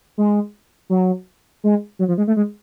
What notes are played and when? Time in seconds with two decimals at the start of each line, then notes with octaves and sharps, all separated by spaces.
0.18 G#3
0.90 F#3
1.64 G#3
1.99 F#3
2.08 F3
2.18 G#3
2.27 A3
2.37 G#3